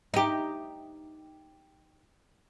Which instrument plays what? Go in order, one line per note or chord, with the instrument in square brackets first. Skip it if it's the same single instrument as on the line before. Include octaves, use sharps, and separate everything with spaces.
[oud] D#4 G4